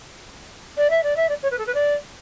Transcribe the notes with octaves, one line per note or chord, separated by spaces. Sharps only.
D5
E5
D5
E5
D5
C#5
B4
A4
B4
D5